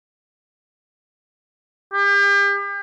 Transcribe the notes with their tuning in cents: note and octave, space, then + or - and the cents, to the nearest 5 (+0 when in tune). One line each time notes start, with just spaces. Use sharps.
G4 +40